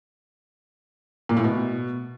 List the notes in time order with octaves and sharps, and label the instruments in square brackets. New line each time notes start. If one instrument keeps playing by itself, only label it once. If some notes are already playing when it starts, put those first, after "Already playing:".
[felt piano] A#2
A2
B2